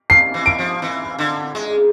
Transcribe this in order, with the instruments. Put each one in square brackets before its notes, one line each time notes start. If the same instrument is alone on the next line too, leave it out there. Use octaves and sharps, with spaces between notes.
[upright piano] C7
[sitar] E3
[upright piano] D7
[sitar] F3
E3
D3
G#3